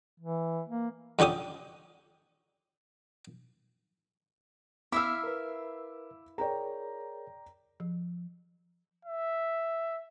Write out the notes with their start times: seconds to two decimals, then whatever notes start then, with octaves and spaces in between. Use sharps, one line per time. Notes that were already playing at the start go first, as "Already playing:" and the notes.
0.20 E3
0.68 A#3
1.19 F2 D3 C#4 G4 D#6
4.92 B3 E4 E5 F5 D6 E6
5.23 A#4 B4
6.38 G#4 A#4 C#5 D5 G5 A#5
7.80 F3
9.05 E5